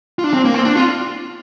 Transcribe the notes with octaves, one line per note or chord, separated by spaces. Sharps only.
F4
D4
C4
A#3
C4
D4
F4